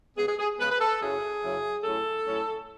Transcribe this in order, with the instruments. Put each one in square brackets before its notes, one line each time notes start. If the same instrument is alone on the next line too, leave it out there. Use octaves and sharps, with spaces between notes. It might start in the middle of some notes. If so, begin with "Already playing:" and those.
[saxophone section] C#3 G#3 B3 G#4
G#4
G#4
C#3 G#3 B3 B4
B4
A4
F#2 C#3 F#3 C#4 E4 G#4
F#2 C#3 F#3 C#4 E4
A2 F#3 C#4 E4 A4
A2 F#3 C#4 E4